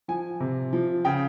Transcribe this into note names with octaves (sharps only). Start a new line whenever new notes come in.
F3 G#5
C3
F3
C#3 G5